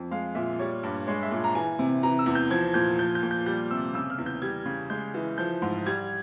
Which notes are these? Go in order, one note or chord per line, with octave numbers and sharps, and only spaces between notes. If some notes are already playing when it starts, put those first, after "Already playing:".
Already playing: F2
G#3 F5
A#2 E5
G3 C#5
G2
G#3 C#5
E5
A#2
A#5
E3 G#5
C3
E3 A#5
E6
E2
G6
F3 G#6
A#2 G6
F3 G6
G6
A#2
G6
G3 G6
C3 E6
C#3 E6
F6
E2
G6
G3 G#6
C#3
G#3 G6
E3
F3 G6
G#2
G3 G#6